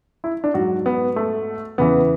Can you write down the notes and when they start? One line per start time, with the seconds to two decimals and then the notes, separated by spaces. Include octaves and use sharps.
0.24 E4
0.44 D4
0.54 G#2 F#3 F#4
0.86 B3
1.16 A3
1.78 E2 C#3 E3 B3